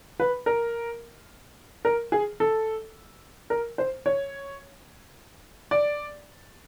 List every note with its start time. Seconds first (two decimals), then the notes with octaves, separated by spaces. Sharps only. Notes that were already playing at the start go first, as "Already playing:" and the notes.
0.20 B4
0.46 A#4
1.85 A#4
2.12 G#4
2.40 A4
3.50 A#4
3.78 C5
4.06 C#5
5.71 D5